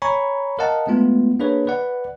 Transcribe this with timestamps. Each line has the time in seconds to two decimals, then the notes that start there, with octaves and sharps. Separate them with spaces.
0.02 C#5 G#5 A#5 B5 C#6
0.59 A#4 D#5 F5 F#5 A5
0.87 G#3 A3 B3 F4
1.39 A#3 D4 G#4 B4 C#5
1.67 B4 D5 F#5